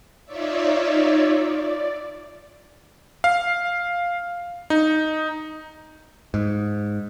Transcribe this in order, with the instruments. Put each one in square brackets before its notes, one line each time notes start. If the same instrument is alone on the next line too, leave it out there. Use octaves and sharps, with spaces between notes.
[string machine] D#4 F4 C#5 D5 E5
D5
[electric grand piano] F5
D#4
[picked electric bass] G#2